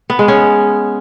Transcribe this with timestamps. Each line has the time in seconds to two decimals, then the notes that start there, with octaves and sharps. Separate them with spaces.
0.10 B3
0.19 G#3
0.28 C#4